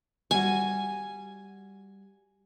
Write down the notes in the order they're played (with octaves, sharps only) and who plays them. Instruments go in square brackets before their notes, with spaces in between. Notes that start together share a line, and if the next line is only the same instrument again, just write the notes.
[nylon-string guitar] G3 F#4 [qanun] G#5